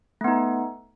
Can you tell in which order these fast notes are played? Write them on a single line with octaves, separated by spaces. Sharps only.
A3 B3 D#4